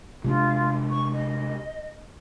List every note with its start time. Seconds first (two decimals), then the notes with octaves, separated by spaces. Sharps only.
0.24 C3 G#3 D4 F4
0.90 C#6
1.14 D#5